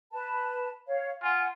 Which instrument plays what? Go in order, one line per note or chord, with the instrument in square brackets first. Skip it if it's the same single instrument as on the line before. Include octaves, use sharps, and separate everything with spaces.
[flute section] B4 A5
C#5 F5
[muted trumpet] F4 [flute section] F#5 G#5